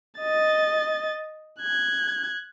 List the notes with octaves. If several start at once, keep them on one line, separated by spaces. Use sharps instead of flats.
D#5 A6
F#6 G#6